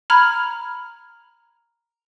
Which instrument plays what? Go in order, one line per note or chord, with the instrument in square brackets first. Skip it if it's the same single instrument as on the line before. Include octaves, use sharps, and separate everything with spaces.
[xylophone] A#5 B5 F6 G#6